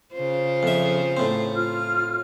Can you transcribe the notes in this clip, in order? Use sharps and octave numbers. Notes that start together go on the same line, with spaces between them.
C#3 F4 C5
F2 E5
A2 C4
F4 F6